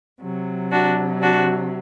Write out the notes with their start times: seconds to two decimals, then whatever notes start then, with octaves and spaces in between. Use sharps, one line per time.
0.21 C3 F#3
0.71 D4 F#4
1.21 D4 F#4